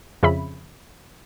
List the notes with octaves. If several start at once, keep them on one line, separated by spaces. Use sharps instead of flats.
F2 C#3 E5 B5